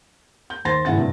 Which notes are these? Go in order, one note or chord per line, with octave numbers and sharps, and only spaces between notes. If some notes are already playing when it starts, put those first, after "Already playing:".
G6
D#2 C5 C6 A6 A#6
G#1 A2 C#3 E4 F#5 A6
G2 C3